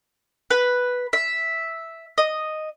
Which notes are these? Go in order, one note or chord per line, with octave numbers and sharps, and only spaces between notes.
B4
E5
D#5